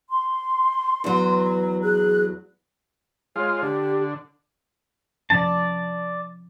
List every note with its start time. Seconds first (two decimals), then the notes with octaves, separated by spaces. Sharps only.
0.11 C6
1.04 E2 F#3 B4
1.83 G#4 F#6
3.36 G#3 F4 C#5
3.62 D3 G4
5.30 C3 F3 C#4 D5 A5